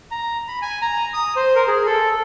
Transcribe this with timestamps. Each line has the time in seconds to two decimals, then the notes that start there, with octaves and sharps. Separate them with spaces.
0.11 A#5
0.48 B5
0.62 G#5
0.82 A#5
1.13 D#6
1.36 C5
1.55 A#4
1.68 G#4
1.86 A4